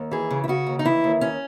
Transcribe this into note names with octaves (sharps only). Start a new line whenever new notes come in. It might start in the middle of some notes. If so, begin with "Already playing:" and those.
Already playing: D#2
E3 G#4
C#3
E4
C#3 F#4
D#2
D#4
E3 E4
D#2
D#2 C#4